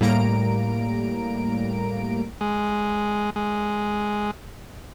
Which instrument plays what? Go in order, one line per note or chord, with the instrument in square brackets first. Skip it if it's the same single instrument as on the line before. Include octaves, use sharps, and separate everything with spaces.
[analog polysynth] A2 G3 A#3 A#5 D7
[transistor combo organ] G#3
G#3